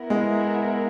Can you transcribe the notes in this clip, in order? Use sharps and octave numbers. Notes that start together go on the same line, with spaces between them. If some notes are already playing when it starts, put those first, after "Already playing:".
Already playing: B3 E4 A#4
G#3